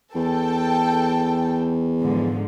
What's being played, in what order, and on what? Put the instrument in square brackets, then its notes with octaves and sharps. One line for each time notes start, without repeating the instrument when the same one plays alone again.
[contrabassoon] E2 [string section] A4 G5
[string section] G#2 D3 F3